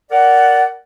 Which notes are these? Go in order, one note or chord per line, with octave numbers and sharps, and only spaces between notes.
A#4 D5 F#5